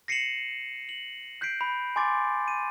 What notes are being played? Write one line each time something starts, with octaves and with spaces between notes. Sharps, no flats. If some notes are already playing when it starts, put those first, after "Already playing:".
A#6 C7 C#7 D#7 E7 F#7
F#7
F#6 G6 B6 C7 D7
B5
G#5 C6 D6 A6
D#7